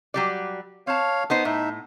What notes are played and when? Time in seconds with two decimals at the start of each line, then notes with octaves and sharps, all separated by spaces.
0.14 F#3 G3 D5
0.87 C4 C#5 F5 A5
1.30 B3 D#4 C5 D#6
1.45 A2 D#4 E5